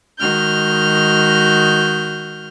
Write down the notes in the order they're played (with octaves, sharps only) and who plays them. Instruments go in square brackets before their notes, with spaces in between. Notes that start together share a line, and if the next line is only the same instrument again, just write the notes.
[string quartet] D#3 G#3 F#4 F6 G6